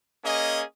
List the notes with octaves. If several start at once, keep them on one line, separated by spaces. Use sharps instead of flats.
A#3 C#4 G#4 D#5